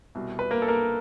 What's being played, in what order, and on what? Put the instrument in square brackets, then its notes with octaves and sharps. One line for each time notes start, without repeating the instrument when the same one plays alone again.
[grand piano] C2 B2
B4
A#3 A#4
A4
A#3 A#4